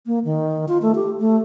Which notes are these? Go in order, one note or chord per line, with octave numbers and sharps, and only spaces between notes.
A#3
D#3
F4
A3
G4
A3